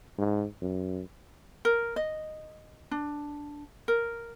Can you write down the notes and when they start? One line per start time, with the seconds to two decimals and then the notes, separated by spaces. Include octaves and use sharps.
0.18 G#2
0.62 F#2
1.65 A#4
1.96 D#5
2.91 D4
3.88 A#4